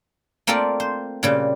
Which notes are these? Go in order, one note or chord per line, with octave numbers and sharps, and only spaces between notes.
A3 A#3 C4 F4 C5 D5
C5
A#2 C#3 G3